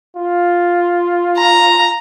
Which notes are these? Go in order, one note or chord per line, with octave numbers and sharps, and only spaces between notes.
F4
A#5